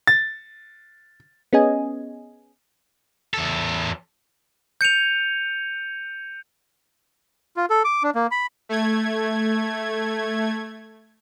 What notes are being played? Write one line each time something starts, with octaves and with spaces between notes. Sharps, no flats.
A6
B3 C#4 G#4 D#5 G#5
E2 A4
G6 C#7 D#7 F7
F4
A4
D6
D4
A#3
B5
A3 G#6